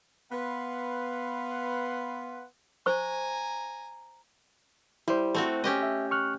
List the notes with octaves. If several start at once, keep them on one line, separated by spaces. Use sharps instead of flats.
B3 B4 F5 F#5 C6
C5 G#5 A#5 C#6
G3 E4 C5
A3 C4 F#4
C#4 G4 D#5
E5
C#6 F6 F#6